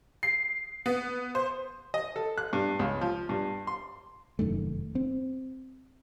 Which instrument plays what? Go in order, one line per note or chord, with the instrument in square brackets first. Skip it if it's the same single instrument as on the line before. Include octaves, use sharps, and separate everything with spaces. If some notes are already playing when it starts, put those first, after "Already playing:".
[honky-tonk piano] C7
B3
C5
[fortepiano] D#5
A4
F#6
G2
C#2
F3
G2
C6
[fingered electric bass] F1 F#2 D#3 A3
C4